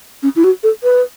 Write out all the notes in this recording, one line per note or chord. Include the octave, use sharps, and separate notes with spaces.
C#4
E4
F#4
A4
B4